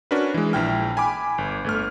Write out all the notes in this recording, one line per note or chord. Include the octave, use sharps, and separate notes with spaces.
C#4 D4 F#4 A#4 B4
E3 G#3
A#1 E4 G5 F6
G#5 B5 D6
G1
G1 A3 F6